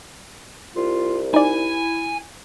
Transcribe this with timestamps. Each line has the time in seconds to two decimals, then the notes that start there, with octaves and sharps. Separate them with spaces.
0.76 C2 F4
1.34 D#4 E4 D5 G#5